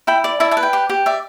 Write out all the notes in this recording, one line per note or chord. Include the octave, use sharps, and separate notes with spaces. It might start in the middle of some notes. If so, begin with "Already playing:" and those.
E4 G5 B5
D5
E4 E5 A5
E5 A5
B4
G5
G4
G4
D5 E5